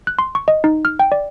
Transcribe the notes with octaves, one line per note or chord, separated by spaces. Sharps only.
F#6
C6
C#6
D#5
D#4
F6
G5
D5